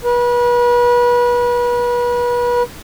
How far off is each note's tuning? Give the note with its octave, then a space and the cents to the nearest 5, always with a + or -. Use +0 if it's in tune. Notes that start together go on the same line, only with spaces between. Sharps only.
B4 -35